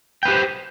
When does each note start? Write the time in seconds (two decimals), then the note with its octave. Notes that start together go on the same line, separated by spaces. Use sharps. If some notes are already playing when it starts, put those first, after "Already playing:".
0.23 G5
0.25 B4
0.28 G4
0.31 C5